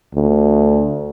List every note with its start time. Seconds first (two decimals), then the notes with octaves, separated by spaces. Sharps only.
0.15 D2